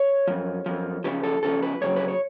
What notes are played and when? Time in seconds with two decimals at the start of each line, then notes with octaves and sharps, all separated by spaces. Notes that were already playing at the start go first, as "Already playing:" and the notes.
Already playing: C#5
0.28 F#2 F3
0.66 F#2 F3
1.04 C#2 C#3 F3 B4
1.23 A4
1.43 C#2 C#3 F3 A4
1.63 B4
1.81 F2 C#3 F#3 C#5
1.96 B4
2.08 C#5